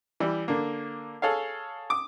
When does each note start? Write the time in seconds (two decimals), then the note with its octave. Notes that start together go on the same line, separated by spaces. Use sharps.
0.20 E3 G3
0.48 D3 A#3
1.22 G#4 A4 C#5 F5
1.90 D6 D#6